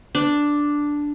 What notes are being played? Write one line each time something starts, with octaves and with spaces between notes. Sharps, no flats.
D4